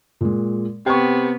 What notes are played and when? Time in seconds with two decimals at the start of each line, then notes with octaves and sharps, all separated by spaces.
0.21 A#2 G#3
0.86 C3 B3 G5 C#6